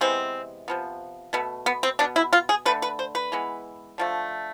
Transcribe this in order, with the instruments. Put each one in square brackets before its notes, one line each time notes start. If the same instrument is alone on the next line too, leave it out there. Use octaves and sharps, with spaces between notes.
[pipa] C3 E3 G#3 B3 C4
C3 F3 B3
B2 A3 B3
B3
C4
B2 B3 D4
E4
F4
G#4
D3 A3 B4
B4
C5
B4
E3 G#3 B3
D3 F3 A3